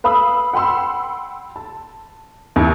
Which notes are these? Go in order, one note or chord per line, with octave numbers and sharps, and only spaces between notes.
B4 F5 B5 D#6 E6
F#5 G5 B5 C6 E6
A5
D#2 E4